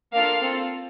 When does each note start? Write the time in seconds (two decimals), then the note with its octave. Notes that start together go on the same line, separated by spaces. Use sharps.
0.14 A#3 D4 F4 A4 F5
0.42 C4 F4 A4